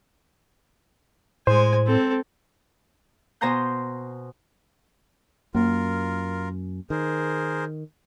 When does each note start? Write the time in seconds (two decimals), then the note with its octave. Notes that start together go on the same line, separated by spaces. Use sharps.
1.47 A2 G#3 C5 G#5
1.86 C4 A4
3.41 B2 C5 G#5 A#5 C6 G6
5.55 F#2 A#3 F4 A#4
6.90 D#3 G#4 A#4 C5